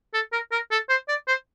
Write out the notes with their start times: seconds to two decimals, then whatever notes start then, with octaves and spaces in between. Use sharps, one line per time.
0.14 A4
0.33 A#4
0.52 A#4
0.71 A4
0.89 C5
1.08 D5
1.28 C5